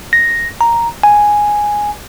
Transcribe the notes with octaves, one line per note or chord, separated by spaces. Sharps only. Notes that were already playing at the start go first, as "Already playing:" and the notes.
A#6
A#5
G#5